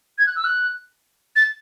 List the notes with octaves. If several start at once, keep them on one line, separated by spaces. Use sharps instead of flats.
G#6
F#6
E6
F#6
A6